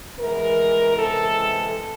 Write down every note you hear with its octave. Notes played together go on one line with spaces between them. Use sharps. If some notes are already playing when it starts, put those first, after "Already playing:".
E3 G#3 B3 A#4
C3 E3 G#3 A4